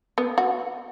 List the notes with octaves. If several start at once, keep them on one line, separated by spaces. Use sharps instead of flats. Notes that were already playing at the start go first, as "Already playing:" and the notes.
B3
F#4